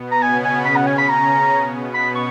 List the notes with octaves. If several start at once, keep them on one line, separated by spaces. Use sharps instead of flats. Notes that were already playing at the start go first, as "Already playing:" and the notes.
Already playing: B2 B3
A#5
C#3 C#4 G#5
G#5
B5
F#5
G#5
B5
A#5
B2 B3
B5
C#6